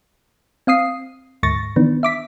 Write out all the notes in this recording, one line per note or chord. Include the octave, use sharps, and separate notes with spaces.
C4 F5 D#6 C7
D2 G#2 C#6 A6 A#6
D#3 E3 B3 D4
E5 D6 B6